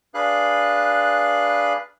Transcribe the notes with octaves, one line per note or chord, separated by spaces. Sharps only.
D4 G#4 B4 F5 F#6